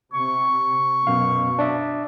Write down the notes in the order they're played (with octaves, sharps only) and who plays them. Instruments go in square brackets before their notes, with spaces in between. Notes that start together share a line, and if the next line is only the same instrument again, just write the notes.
[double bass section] C3 [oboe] C#6
[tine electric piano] F#2 F5 [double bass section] B2
[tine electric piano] D4 D5 E5